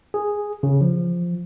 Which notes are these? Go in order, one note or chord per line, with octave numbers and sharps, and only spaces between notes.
G#4
C#3
F3